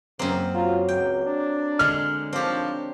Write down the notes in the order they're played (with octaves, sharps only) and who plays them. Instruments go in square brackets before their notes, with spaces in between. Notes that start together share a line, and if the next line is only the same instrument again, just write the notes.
[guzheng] F#2 C4 [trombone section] C#3 [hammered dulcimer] A#3
[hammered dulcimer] F#3 [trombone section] F4
[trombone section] C#2 [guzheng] G5
[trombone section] D4
[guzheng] D3 G#3 [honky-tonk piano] F6
[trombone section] D#3 F3 [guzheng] C4 G4 [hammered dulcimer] D4 C#5